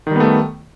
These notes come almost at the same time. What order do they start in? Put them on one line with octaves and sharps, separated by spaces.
D#3 G3 B3 A3